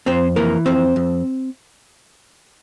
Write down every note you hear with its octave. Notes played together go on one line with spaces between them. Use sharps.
F2 C4 C5
E3 A#3 A#4
F2 C4 C5
F2